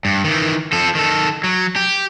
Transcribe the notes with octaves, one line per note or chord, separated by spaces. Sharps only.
G2
D#3 E3
F3 A4
D#3 A4
F#3
G4